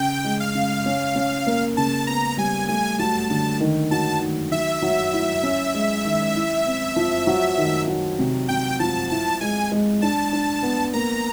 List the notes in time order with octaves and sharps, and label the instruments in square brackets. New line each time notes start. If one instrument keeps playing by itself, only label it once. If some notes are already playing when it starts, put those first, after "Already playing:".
Already playing: [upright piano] C#3 [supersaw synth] G5
[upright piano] G#3
[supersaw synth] F5
[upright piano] C#3
C#4
C#4
A#3
[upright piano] C#3 [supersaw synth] A5
[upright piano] B3 [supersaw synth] A#5
[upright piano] G3 [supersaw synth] G#5
[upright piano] A3 [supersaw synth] G#5
[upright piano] F#3 [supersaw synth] A5
[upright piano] D3 [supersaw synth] A5
[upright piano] D#3
[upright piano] F#3 [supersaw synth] A5
[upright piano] D#3
[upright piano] F#3 [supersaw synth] E5
[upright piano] F#3
E4
C#4
G#3
D#3
E4
C4
F3
F#3
D#3
F#3
C3
[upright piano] C3 [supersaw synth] G5
[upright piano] F3 [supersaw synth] A5
[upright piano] E4 [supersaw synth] A5
[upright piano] G#3 [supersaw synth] G#5
[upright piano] G#3
[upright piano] D4 [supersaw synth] A5
[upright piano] D4
B3
[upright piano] A#3 [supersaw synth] A#5